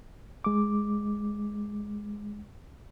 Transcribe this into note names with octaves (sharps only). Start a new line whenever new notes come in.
G#3 D6